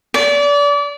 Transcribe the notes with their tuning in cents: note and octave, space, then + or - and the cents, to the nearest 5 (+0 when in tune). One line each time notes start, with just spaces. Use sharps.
D5 -30